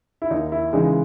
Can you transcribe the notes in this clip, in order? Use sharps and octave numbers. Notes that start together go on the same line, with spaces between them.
E4
D#2 D#4
E4
C#3 E3 G#3 D#4